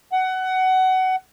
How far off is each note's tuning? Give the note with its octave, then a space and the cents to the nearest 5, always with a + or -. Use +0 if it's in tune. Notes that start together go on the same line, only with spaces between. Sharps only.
F#5 +20